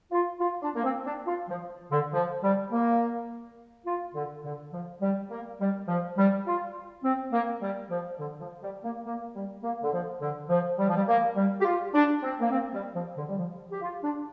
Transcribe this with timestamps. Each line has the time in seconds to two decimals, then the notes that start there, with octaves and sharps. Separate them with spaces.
0.11 F4
0.40 F4
0.62 D4
0.74 A#3
0.83 C4
1.05 D4
1.27 F4
1.48 F3
1.91 D3
2.13 F3
2.43 G3
2.71 A#3
3.86 F4
4.15 D3
4.44 D3
4.72 F3
5.02 G3
5.30 A#3
5.60 G3
5.88 F3
6.17 G3
6.46 F4
7.03 C4
7.32 A#3
7.61 G3
7.90 F3
8.19 D3
8.40 F3
8.62 G3
8.84 A#3
9.05 A#3
9.35 G3
9.63 A#3
9.82 D3
9.92 F3
10.20 D3
10.49 F3
10.78 G3
10.88 F3
10.96 G3
11.08 A#3
11.36 G3
11.60 G4
11.65 F4
11.94 D4
12.22 C4
12.40 A#3
12.51 C4
12.73 G3
12.94 F3
13.16 D3
13.29 G3
13.37 F3
13.71 G4
13.82 F4
14.03 D4